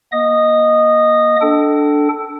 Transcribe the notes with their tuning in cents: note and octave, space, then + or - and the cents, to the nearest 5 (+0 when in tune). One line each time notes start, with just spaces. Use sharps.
A#3 +30 D#5 +0 D#6 -15
D4 +0 A4 +0 G5 -35